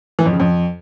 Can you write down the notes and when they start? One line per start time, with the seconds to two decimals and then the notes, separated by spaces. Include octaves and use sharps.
0.19 E3
0.26 F2
0.33 C#3
0.40 F2